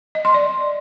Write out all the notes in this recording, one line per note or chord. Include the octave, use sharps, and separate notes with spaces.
D#5
C6
D5